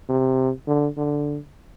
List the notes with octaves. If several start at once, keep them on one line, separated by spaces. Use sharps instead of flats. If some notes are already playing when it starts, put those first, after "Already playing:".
C3
D3
D3